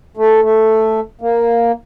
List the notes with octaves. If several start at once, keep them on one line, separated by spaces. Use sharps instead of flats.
A3
A3
A#3